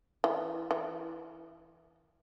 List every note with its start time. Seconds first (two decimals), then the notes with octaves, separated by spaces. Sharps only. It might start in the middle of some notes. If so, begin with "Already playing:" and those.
0.24 E3
0.71 E3